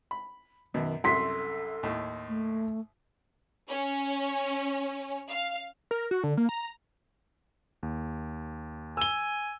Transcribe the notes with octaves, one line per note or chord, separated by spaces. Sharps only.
B5
F#2 B2 D#3
C2 F#2 A4 C6 B6
D#2 A2
A3
C#4
F5
A#4
F#4
D3
A#3
A#5
D#2
G#5 E6 G7